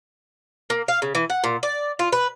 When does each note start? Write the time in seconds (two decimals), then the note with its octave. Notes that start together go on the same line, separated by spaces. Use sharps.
0.70 A#3
0.88 F5
1.02 C#3
1.15 E3
1.30 F#5
1.44 A#2
1.63 D5
1.99 F4
2.12 B4